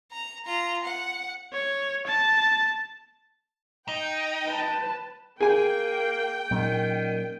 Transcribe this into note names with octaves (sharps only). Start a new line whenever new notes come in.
A#5
F4 A#5
F#5
C#5
A5
D#4 G5
B4 A5
A#3 G#4 G5 G#5
A#2 D#3 F#3 C#4